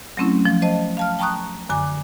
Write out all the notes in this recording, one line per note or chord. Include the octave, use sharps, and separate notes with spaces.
F#3 A3 C4 C#4 E4
F3
C5 D#5 A5
F5 A5 F6
G5 A5 A#5 C#6 D#6 F#6
F#2 D3 G#5 D6